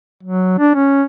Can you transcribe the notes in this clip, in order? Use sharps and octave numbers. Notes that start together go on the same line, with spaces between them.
F#3
D4
C#4